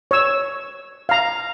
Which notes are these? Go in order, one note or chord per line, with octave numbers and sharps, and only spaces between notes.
C#5 E6
F5 A#5